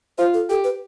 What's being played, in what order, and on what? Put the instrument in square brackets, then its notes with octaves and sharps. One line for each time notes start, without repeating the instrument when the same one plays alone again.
[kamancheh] F4 [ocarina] C5
[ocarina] A4
[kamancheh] G4 [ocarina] A4
[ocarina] B4